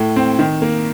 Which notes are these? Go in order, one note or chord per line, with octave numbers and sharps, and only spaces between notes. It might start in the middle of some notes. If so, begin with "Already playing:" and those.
Already playing: A2
C4
D#3
A#3